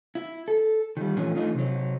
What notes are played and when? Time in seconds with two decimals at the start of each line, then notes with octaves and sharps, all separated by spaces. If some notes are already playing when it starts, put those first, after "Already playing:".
0.15 E4
0.48 A4
0.97 D#3 G3
1.16 A#2 E3 F3 A3 C#4 D4
1.35 E3 A3 D4 D#4 F4
1.54 C3 F#3